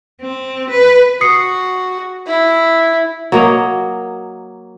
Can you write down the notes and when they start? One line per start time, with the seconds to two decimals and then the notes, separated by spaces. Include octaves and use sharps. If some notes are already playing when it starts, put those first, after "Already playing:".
0.22 C4
0.70 B4
1.21 F#4 D#6 C7 C#7
2.27 E4
3.32 F#3 A#3 D#5